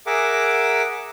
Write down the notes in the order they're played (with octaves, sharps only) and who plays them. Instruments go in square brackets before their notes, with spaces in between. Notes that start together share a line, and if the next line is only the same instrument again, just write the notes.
[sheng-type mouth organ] G#4 A#4 E5 F#5 D6